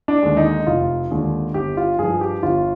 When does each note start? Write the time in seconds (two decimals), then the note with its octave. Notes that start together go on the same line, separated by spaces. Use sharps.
0.08 D4
0.23 D#2 D3 G#3
0.37 D#4
0.67 F1 F4
1.11 D#2 D3 G#3
1.54 G1 G4
1.77 F4
1.99 G2 F3 G#4
2.21 G4
2.43 G1 F4